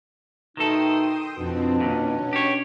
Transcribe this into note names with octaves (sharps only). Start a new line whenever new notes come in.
B2 D#3 A3 D#4 A4 G5 C6 D#6
F2 B2 F3 C4 D4
D#2 A#2 C#4
G4 C#5